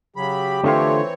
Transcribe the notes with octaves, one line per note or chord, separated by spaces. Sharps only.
C#3 F#3 G4 B5
D3 E3 A3 C4 F4 C5 C#5